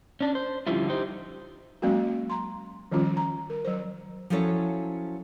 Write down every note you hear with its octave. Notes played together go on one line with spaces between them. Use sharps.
C#4 D4
C5
D3 F3 G3 C#4 E4 F4
D#4 G4 C5
F#3 G#3 A#3 C#4 F#4
A#5 C6
D#3 F3 G3 C#4 F4
A#5
A#4
F#3 C5
F3 F#3 C#4 E4 A4 C#5